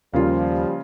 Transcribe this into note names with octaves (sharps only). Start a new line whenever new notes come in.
D#2 C#3 F3 G3 A#3 F4